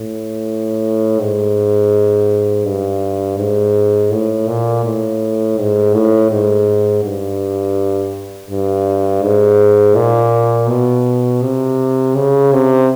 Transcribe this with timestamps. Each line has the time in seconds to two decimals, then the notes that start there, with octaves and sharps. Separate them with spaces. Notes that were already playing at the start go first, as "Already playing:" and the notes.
Already playing: A2
1.19 G#2
2.66 G2
3.39 G#2
4.12 A2
4.48 A#2
4.85 A2
5.58 G#2
5.94 A2
6.31 G#2
7.04 G2
8.50 G2
9.23 G#2
9.96 A#2
10.69 B2
11.42 C3
12.15 C#3
12.52 C3